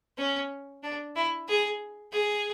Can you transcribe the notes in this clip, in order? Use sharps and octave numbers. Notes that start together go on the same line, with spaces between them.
C#4
D4
E4
G#4
G#4